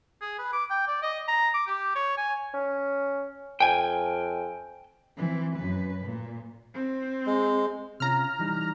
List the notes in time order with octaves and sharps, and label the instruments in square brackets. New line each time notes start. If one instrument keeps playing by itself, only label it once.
[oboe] G#4
B4
D6
G5
D5
D#5
A#5
D6
G4
C#5
G#5
[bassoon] C#4
[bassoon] F2 [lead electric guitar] G5 G#5
[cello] E3 C4
F#2 B4
A#2
[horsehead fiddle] C4
[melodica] G#3
[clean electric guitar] C3 C#4 F4 [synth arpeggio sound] A#5 F6
[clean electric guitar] E3 G3 D#4